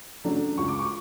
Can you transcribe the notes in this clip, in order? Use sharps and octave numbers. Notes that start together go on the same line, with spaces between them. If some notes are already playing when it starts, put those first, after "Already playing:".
C#3 F#3 A3 D4
C#2 C#6
D6
C#6